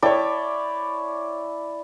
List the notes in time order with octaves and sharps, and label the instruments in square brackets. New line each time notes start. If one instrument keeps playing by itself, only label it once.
[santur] E4 D5 A5 [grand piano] C#5 G5